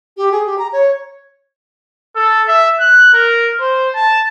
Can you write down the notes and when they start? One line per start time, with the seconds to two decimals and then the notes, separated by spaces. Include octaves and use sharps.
0.17 G4
0.32 G#4
0.46 G4
0.58 A#5
0.73 C#5
2.16 A4
2.48 E5
2.80 F#6
3.14 A#4
3.60 C5
3.95 A5